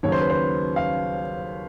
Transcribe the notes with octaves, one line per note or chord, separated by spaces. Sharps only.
D#2 C#3 F#3 C#5
C5
B4
C5
F5